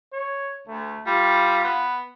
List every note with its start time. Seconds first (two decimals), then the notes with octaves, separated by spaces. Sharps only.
0.13 C#5
0.68 D2 A3
1.07 G3 F4
1.64 B3